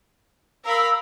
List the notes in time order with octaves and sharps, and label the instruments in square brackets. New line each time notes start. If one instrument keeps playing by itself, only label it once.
[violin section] A#4 F5 B5 [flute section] E6